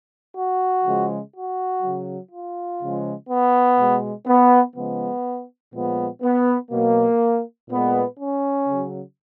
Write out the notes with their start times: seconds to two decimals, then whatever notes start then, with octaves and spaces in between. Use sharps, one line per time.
0.35 F#4
0.84 C#3 F3 G#3
1.34 F#4
1.82 C#3 F#3
2.31 F4
2.80 C#3 F3 G#3
3.29 B3
3.78 B2 G#3
4.27 B3
4.75 C#3 F3 G#3 B3
5.73 A#2 F3 G#3 B3
6.22 B3
6.71 B2 F#3 A#3
7.69 A#2 G#3 B3
8.18 C#4
8.67 C#3 F#3